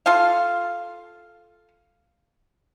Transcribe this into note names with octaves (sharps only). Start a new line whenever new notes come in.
F4 A4 F5